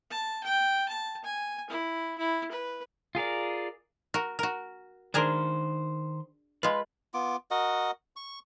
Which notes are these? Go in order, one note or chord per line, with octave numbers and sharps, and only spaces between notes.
A5
G5
A5
G#5
E4
E4
B4
F4 G#4 A#4 D5
F#4 A#4
F#4 A#4
D#3 D4 G#4 A#4 C5
G#3 F4 B4
B3 F4 D6
F#4 A#4 D#5 F#5
C#6